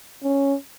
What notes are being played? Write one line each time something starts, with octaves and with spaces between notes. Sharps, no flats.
C#4